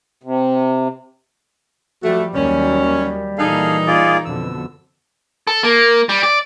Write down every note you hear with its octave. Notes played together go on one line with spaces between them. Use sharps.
C3
F3 G3 A3 F#4
D#2 F#3 G3 A#3 C#4
A#2 E3 A#3 D#4 G#4 A4 F5
F4 G#4 D5
F2 B2 D3 E6
A4
A#3
G3
D5